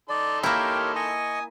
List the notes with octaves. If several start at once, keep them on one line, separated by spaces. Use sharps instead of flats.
D#4 A4 D5 C6
A#3 E4 G4 A#4 C#5 G5
D#5 G#5 C#6 D#6